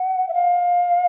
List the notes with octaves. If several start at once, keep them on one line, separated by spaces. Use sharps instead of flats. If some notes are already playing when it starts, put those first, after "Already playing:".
Already playing: F#5
E5
F5